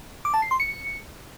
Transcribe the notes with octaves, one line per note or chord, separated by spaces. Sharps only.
D6
A5
C7
C6
C#7